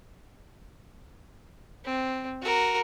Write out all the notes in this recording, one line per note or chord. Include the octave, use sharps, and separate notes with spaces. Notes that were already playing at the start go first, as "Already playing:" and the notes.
C4
F#4 A#4